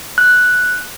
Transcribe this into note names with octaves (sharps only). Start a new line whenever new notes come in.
F#6